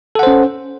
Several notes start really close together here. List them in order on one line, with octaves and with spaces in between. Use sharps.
A4 F#5 C5 C#4